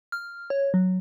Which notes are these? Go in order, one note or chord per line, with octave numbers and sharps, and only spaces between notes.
F6
C#5
F#3